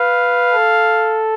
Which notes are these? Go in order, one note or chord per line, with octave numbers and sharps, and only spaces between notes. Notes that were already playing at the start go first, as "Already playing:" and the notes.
Already playing: B4 F5
A4